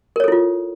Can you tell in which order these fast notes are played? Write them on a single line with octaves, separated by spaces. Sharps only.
A#4 C#5 A4 E4 F4